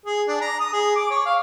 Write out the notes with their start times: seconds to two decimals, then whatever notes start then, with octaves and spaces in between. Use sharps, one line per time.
0.06 G#4
0.28 D4
0.41 A#5
0.60 D#6
0.73 G#4
0.95 D6
1.11 C#5
1.26 F5